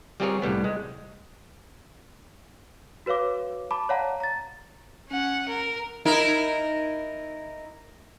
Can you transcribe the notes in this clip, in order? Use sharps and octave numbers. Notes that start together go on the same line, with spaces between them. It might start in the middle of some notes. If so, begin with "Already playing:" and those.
G3 C4 F4 G#4 A#4 C#5
C2 A2 G3 B3
G#3
F#4 B4 C#5 F5 D6
A5 B5 D6
C#5 D5 F5 F#5 A5 A#5
A#5 A6
C#4 F#5
A#4
D#4 E4 A#4